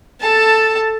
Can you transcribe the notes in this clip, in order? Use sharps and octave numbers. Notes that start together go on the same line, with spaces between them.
A4 A5